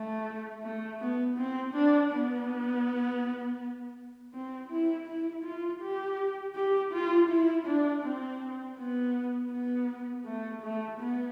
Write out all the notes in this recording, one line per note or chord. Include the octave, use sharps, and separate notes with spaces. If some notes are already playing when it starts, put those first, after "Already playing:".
Already playing: A3
A3
B3
C4
D4
B3
C4
E4
E4
F4
G4
G4
F4
E4
D4
C4
B3
B3
A3
A3
B3